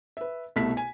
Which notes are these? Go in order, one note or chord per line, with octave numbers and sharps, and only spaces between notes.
B4 E5
C2 B2 A3 E5 B6
G#5